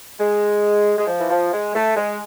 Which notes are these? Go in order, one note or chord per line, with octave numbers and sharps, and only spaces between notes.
G#3
G#3
F3
E3
F3
G#3
A3
G#3